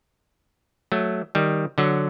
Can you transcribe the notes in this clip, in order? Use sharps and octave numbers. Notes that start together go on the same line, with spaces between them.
F#3 A3
D#3 G3
D3 F#3